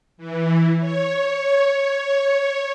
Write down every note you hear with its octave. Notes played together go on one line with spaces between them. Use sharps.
E3
C#5